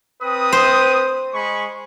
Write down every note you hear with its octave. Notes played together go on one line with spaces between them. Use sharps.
C4 B4 D#6
C5
G#3 B5 C#6